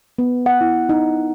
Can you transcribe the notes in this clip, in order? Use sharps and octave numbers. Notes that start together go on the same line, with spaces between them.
B3
F#5
E4
D#4